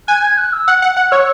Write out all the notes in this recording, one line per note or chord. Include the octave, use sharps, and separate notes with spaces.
G#5 F#6
G#6
F#6
E6
F#5 F#6
F#5
F#5 F#6
C#5 E6